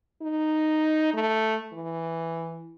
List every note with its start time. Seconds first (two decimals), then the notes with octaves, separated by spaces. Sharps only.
0.22 D#4
1.14 A3
1.73 E3